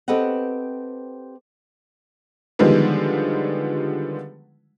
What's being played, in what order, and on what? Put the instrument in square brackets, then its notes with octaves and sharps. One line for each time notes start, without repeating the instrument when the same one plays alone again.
[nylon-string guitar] C4 G4 A4 B4 D#5 F#5
[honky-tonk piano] D3 D#3 F3 G3 G#3 B3